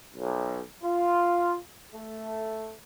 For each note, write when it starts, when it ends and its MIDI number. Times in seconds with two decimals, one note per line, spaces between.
0.16 0.59 35
0.84 1.56 65
1.93 2.71 57